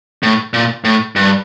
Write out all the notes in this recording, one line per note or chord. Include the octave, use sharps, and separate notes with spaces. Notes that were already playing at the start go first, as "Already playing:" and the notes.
A2
A#2
A2
G2